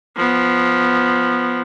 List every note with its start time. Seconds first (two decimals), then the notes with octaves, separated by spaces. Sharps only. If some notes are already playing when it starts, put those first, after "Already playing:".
0.16 F3 B3